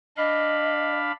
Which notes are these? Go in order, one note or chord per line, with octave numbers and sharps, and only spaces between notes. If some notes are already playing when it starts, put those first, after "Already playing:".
D4 D#5 F5 B5